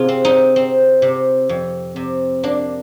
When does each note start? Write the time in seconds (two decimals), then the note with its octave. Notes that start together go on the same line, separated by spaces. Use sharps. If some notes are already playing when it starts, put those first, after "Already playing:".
Already playing: C3 F4 G#4
0.08 C4
0.25 D#4
0.56 C4
1.02 C3
1.49 F2
1.96 C3
2.43 A#3 D4